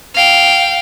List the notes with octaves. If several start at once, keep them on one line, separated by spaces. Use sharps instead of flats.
F5 G5